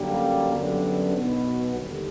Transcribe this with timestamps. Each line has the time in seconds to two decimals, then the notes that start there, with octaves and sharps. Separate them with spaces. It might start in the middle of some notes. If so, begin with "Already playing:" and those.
Already playing: F#2 D3 G3 A#3
0.51 F#2 D3 G3 B3
1.13 B1 B2 F#3 B3
1.75 D#2 D3 G3